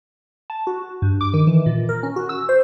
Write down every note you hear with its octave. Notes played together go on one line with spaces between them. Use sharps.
A5
F#4
G2
D6
D#3
E3
A#2
A#4
C#4
F#4
E6
C5